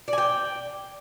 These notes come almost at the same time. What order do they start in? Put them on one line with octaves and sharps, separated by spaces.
D5 G#5 G5